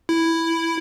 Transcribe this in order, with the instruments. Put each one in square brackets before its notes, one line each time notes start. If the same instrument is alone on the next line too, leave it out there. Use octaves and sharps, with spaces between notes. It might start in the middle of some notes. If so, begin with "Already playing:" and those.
[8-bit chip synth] E4